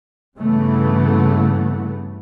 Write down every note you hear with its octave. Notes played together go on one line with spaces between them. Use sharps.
G2 C#3 E3 A3 B3